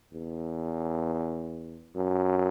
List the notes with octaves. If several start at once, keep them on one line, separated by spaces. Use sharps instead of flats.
E2
F#2